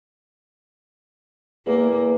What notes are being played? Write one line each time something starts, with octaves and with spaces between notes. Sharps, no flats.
E2 A#3